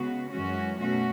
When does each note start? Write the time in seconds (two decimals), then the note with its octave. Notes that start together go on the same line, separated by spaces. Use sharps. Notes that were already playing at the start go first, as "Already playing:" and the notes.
Already playing: C#3 G#3 B3 F#4
0.33 F#2 E3 G#3 C#4 F#4
0.79 B2 A3 C#4 F#4